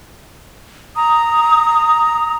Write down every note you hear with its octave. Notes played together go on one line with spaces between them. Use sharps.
A#5 D#6